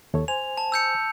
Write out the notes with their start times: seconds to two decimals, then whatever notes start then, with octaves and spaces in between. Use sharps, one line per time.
0.14 D#2 A4 C#5
0.28 C5 G#5 F7
0.57 A5
0.72 E6 G6 C#7